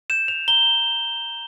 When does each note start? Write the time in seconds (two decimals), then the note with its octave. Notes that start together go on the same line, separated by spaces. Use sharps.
0.10 G6 E7
0.28 F7
0.48 A#5 G7